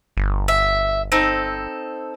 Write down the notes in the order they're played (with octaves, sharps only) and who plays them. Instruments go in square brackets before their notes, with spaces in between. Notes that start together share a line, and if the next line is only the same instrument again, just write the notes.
[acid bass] G1
[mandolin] E5
C4 D#4 A4